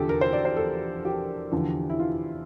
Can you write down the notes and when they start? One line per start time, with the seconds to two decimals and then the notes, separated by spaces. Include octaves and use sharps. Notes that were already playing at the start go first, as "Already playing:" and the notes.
Already playing: E2 D3 F3 G4 A4
0.09 A#4
0.21 C5
0.33 D5
0.45 C5
0.57 A4
1.05 G4
1.52 E2 D3 F3
1.90 E4
2.00 F4